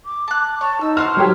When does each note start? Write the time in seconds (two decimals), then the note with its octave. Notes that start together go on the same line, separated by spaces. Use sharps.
0.05 D6
0.28 A5 F#6
0.61 C#5 A5
0.81 D#4 E6
0.97 F#4 C5 A5 F6
1.17 F#3 G4 C#5